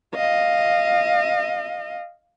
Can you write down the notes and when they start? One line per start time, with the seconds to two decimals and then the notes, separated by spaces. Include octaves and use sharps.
0.15 D#5 F5